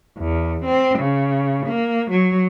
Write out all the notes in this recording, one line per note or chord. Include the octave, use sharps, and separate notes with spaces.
E2
C4
C#3
A#3
F#3